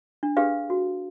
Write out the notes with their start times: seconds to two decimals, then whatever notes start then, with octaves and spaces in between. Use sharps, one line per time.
0.23 D4
0.37 D4 G4 G#4 B4 F5
0.70 F#4